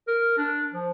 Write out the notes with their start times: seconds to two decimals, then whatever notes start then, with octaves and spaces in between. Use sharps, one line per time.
0.08 A#4
0.38 D4
0.73 F3